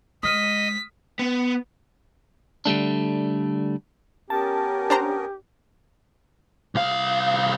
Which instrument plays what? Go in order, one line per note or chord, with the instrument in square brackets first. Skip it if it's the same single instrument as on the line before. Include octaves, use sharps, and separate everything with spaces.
[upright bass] G#3 [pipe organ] D#5 [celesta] D#6 F6 D#7 [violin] B6
[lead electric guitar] B3
[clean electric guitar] D3 G3 A3 D4
[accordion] B3 C#4 A#4 [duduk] G4 [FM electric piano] A5
[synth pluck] D4 C5 A#5
[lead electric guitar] C2 F5